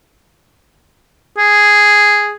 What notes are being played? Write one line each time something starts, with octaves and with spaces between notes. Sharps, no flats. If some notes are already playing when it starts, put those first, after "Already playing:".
G#4